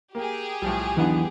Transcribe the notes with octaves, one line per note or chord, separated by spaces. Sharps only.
A#3 G4 G#4
B1 A2 F3 G3
E2 D3 E3 F#3 B3 D#4